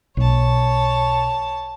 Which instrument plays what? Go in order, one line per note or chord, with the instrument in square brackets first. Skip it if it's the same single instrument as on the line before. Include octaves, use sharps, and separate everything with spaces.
[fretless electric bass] B1 [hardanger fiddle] C#5 A5